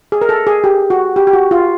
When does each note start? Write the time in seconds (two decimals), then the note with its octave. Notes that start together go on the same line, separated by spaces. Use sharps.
0.12 G#4
0.22 A#4
0.29 A4
0.47 G#4
0.64 G4
0.90 F#4
1.16 G4
1.27 G4
1.33 F#4
1.51 F4